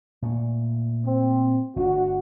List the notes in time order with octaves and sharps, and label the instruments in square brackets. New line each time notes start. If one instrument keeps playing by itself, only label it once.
[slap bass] A#2 A3
[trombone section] C4
[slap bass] G1 A3 D4 [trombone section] F#4